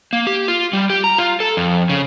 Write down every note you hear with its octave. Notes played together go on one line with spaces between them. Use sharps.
A#3
G4
F4
G3
G4
A#5
F4
A4
F2
C#3